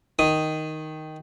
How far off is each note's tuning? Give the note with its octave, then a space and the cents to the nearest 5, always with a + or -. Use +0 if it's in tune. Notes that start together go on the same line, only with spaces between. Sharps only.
D#3 +0 D#6 +0